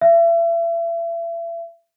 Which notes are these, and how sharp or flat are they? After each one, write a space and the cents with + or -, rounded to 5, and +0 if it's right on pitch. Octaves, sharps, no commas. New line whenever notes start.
E5 +35